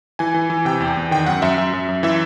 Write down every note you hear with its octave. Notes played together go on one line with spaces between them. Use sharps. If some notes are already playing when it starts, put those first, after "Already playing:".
E3 G#5
E3
E3
C3 G5
E2
E2
D#3 G5
F#2 F#5
F#2 E5
F#2 E5
F#2
F#2
E3 E5